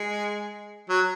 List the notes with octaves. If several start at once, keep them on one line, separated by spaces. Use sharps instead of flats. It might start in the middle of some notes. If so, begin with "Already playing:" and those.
Already playing: G#3
F#3